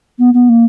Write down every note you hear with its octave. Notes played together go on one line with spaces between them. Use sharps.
B3
B3
A#3